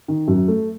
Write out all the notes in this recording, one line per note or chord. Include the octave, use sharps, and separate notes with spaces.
D#3
F#2
A3